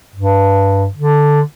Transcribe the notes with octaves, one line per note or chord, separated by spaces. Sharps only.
G2
D3